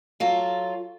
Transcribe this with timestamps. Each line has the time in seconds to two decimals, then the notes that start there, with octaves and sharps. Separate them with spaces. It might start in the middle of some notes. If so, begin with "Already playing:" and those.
0.20 F#3 F4 A4